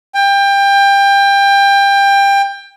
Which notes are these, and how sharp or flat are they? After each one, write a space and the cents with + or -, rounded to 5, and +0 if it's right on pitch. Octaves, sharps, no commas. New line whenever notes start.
G5 +25